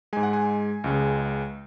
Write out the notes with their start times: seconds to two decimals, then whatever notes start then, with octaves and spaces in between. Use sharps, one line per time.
0.13 G#2 G#3 G#5
0.23 F#5
0.33 G#5
0.84 C#2 C#3 G#3